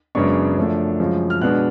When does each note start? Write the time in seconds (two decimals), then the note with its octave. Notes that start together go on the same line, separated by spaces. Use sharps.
0.15 F#2 C#3 G#3 B3 D4 C#6
0.57 F#2 F3 A3 D4
0.99 F#2 C#3 F3 G#3
1.30 F6
1.42 B2 G#3 B3 D4 F#6